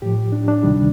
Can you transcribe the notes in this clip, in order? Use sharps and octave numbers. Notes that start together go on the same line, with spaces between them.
A2 F3 G4
D4
D4
D2 C3 D#3 G3